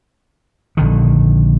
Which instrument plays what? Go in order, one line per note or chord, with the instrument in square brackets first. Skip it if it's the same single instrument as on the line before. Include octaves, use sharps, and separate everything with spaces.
[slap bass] A#1 D3 D#3